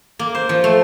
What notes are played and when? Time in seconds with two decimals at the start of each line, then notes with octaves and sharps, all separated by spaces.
0.19 A#3
0.35 C5
0.49 F3
0.64 A3